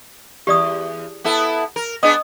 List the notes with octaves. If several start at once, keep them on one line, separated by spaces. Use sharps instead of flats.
E2 G4 D5 D#6
B3 E4 A4
A#4
B3 D4 G#4 D#5 D#6